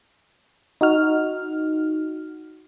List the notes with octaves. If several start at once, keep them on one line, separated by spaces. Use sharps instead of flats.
D#4 F#4 F6